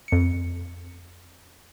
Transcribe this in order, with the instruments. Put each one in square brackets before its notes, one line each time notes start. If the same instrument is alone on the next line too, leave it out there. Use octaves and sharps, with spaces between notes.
[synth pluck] F2 C#7